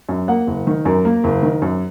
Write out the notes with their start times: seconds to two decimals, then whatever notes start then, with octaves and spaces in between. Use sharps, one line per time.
0.09 F#2
0.28 A#3 F#5
0.47 F#1
0.67 D#3
0.85 F#2 A#4
1.05 A#3
1.24 F#1
1.43 D#3
1.62 F#2